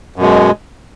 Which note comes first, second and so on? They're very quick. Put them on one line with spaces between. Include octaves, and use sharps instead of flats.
F#2 B2 G#3